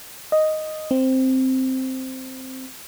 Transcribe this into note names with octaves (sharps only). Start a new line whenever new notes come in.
D#5
C4